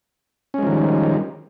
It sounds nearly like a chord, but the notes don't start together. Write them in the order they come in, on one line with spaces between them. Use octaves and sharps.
C#4 G#3 F3 D#3 G3